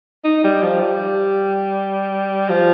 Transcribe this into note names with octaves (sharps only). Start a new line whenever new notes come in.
D#4
G3
F3
G3
F3